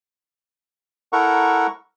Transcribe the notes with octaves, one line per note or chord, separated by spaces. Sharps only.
E4 A4 A#4 F#5 A#5 C#6